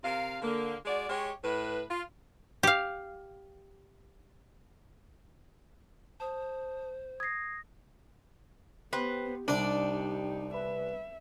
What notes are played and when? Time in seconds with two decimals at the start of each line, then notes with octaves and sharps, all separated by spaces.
0.04 C3 A#4 F5
0.42 D3 A#3
0.85 G#3 F#4 D5
1.10 G#3 G4 C#5
1.44 A2 B4
1.90 F4
2.63 G4 F5
6.20 C5 A5 D#6
7.20 D#6 G#6 A#6 C7
8.93 B3 G4 B4 C5
9.48 C2 D4 D#4 D5
10.54 B4 E5